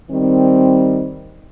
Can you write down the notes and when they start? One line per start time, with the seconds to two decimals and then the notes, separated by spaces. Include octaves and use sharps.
0.11 D#3 G3 C4